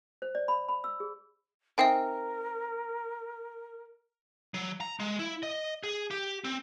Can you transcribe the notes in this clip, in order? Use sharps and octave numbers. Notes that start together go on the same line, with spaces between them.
C5
D5
B5
B5
E6
G#4
C4 D#4 A#4 E5 G5 G#5
F#3
A#5
G#3
E4
D#5
G#4
G4
C4